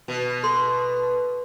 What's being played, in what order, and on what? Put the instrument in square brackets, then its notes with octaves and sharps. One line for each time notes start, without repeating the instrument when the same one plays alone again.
[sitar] B2
[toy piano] A4 C6